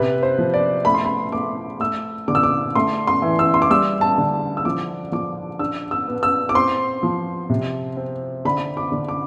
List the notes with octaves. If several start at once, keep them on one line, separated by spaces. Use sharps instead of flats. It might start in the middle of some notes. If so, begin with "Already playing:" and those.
Already playing: C3 B4
C5
F3
D5
A3 B5
C6
B5
A3 D6
A3 E6
D3 D6
E6
D6
A3 C6
C6
E3
E6
C6
D6
G3 E6
A5
D3
E6
F3 D6
F3 D6
D4 E6
E6
B3
E6
D6
C4 C6
F3
C3
C4
D3 B5
D6
D3
D6